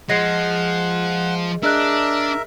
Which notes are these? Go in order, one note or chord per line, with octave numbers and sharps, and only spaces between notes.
F3 G#3 F#5 A#6 C7
D4 G#4 A#4 D#5 E5 F#6